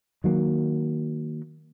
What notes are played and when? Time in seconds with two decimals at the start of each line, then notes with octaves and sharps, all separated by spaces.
0.24 D#3 F#3 A#3